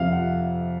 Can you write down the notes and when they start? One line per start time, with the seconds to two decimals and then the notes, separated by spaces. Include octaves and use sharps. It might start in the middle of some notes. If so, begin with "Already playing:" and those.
Already playing: F2 C3 F3 E5 F5
0.12 F#5